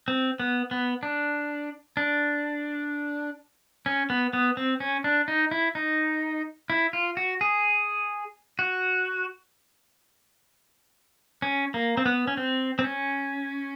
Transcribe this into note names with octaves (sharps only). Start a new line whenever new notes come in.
C4
B3
B3
D4
D4
C#4
B3
B3
C4
C#4
D4
D#4
E4
D#4
E4
F4
F#4
G#4
F#4
C#4
A#3
C4
B3
C#4
C4
C4
C#4